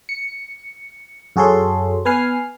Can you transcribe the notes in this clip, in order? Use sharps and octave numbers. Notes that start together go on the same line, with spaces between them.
C#7
F#2 F#4 G#4 A4 C#5 C6
B3 B4 G#5 F6 C7